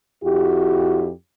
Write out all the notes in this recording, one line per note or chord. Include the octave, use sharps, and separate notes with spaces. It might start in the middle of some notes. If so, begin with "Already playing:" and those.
F2 E4 F#4 G4